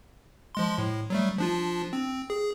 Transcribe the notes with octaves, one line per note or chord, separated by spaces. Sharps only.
F3 G#3 C6
A2
F#3 G3 A3
F3 D4 F4
C4
G#4